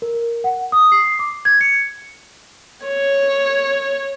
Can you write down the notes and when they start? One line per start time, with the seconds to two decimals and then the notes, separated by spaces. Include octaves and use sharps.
0.02 A#4
0.44 F#5
0.72 D#6
0.92 C7
1.19 D6
1.45 G#6
1.61 C#7
2.86 C#5